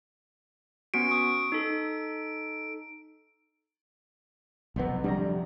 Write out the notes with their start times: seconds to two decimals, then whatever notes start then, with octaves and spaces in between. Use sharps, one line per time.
0.94 B3 C#4 F#4 D7
1.11 C#6 D#6
1.52 D#4 A4
4.76 B1 F2 C3 F#3 B3
5.04 D2 G3 D4 A#5